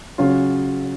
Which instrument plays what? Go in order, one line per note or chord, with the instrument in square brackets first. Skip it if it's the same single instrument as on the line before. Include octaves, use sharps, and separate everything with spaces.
[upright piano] C#3 F#3 C#4 F4